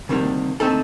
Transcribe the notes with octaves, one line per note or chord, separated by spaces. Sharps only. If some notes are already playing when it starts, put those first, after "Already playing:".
D2 C3 D#3 G3 A#3
D3 A3 C4 D#4 A4